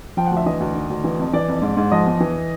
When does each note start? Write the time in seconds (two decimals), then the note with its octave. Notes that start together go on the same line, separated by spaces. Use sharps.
0.17 F3 G5
0.27 D2 F#5
0.37 E5
0.46 E3 D#5
0.60 D2
0.75 D#3
0.90 D2
1.04 E3
1.19 F2
1.33 E3 D5
1.48 F2
1.62 G#2
1.77 G#2
1.91 F3 D#5
2.06 E2
2.20 E3